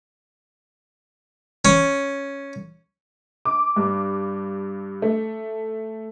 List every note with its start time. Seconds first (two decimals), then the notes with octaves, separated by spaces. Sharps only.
1.65 C#4
3.45 D6
3.76 G2
5.02 A3